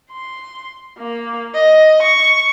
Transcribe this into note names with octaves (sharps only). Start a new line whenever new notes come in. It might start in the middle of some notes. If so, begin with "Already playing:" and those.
C6
A#3
D#5
C#6